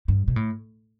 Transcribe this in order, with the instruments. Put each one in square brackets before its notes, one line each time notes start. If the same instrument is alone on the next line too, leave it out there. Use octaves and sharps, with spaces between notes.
[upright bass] G2
B2
A2